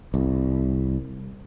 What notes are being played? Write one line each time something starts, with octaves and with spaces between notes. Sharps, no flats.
C2